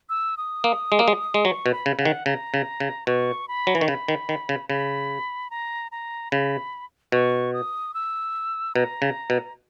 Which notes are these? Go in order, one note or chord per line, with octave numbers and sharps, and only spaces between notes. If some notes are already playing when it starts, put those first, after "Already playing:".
E6
D#6
A#3
G#3
A#3
G#3
G#3
F#3 C#6
B2
B5
C#3
C#3 F#5
D#3
C#3 A#5
C#3
C#3
B2 C#6
B5
F#3
E3
D#3 C#6
C#3 B5
D#3
D#3
C#3
C#3 B5
A#5
A#5
C#3 B5
B2 C#6
D#6
E6
B2 A#5
C#3
B2